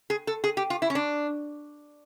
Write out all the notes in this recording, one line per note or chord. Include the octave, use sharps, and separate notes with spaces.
G#4
A4
G#4
G4
F4
E4
C#4
D4